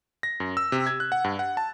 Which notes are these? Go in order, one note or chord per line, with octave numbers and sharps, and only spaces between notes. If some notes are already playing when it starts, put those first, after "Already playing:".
A#6
F#2
E6
C3
G#6
F#6
F#5
G2
F#5
A5